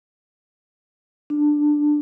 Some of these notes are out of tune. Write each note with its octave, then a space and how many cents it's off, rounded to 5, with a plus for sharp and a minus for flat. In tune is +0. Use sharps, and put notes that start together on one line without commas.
D4 +10